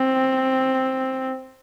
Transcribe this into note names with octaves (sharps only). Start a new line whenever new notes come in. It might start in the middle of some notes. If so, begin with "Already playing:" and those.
Already playing: C4